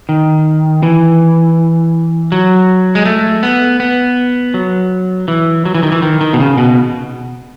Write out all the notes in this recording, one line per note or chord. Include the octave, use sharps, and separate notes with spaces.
D#3
E3
F#3
G#3
A3
B3
B3
F#3
E3
F#3
E3
D#3
E3
D#3
D#3
B2
C#3
B2